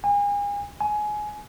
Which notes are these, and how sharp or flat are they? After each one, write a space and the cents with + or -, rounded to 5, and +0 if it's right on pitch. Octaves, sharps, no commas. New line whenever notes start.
G#5 -35
G#5 +20